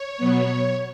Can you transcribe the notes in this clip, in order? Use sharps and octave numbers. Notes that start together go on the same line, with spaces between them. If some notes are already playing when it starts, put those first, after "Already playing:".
Already playing: C#5
B2 F#3 B3